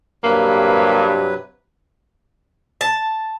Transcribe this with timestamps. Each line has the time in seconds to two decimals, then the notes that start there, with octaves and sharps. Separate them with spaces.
0.24 G2 C3 F#3 A#3 B4
2.81 A5